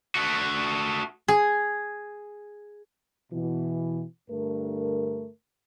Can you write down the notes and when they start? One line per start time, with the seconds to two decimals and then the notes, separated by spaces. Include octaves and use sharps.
0.15 A3 F#4
1.28 G#4
3.33 B2 E3
4.30 G2 D3 A3 A#4